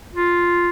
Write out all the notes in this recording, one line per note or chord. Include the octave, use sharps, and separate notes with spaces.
F4